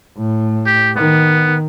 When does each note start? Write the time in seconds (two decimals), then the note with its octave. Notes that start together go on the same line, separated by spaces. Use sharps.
0.18 A2
0.66 G4
0.96 D#3 B3